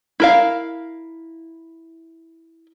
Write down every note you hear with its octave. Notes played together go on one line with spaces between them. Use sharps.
E4 A#4 F5